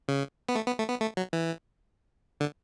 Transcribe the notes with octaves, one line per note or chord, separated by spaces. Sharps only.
C#3
B3
A3
B3
A3
B3
A3
F#3
E3
D3